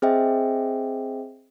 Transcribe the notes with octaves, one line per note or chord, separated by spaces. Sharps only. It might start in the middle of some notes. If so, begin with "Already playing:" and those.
C4 G#4 C5 D#5 E5 G5